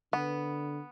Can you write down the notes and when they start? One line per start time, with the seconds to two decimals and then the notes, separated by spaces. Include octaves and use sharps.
0.13 D3 B3